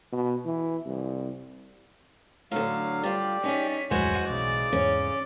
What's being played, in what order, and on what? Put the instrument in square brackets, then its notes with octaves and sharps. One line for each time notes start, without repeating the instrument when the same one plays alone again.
[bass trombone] B2
E3
C2
[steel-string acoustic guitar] A2 D3 [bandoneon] F#3 F5
[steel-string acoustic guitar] G3 F4 [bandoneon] G4 D5
[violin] C#4 B6 [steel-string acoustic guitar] D#4 G#4
[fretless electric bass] D1 F2 [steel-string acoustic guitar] E3 G#3 [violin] F#4 [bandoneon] C5 G#5
[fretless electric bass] B1 [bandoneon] C#3 [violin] D5
[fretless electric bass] E2 G#2 [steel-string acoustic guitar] C#4